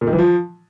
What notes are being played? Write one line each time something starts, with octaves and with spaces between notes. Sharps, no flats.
A#2
D#3
E3
F3